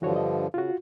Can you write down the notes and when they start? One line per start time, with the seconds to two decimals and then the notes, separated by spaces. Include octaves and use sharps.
0.02 G2 D3 E3 F3 F#4 C#5
0.16 D#5
0.54 C#3 F4 F#4